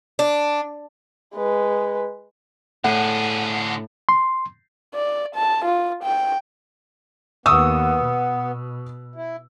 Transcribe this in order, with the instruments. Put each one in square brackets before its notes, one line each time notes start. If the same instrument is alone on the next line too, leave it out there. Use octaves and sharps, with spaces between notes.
[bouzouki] D4
[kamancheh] G#3 B4
[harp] A2 [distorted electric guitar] D3 G#4 [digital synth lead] F#5
[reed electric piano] C6
[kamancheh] D5
A5
F4
G5
[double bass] D#2 [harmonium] B3 [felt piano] C#6 D#6 E6
[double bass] B2
[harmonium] E4